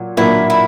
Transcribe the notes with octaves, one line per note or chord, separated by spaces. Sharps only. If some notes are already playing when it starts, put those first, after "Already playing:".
Already playing: A#2 F#3
A#2 F#3 A#3 D4 E4
E4